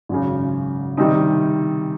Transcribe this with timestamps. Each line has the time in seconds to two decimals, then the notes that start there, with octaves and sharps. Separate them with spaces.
0.09 G#1 F#2 C#3
0.97 C3 D#3 G3 C4 D#4